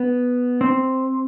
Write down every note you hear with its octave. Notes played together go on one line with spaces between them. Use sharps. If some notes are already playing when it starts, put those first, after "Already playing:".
Already playing: B3
C4